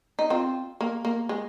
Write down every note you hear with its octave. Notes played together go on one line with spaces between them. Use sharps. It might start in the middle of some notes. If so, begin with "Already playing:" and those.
D#4
C4 F4
A#3
A#3
G#3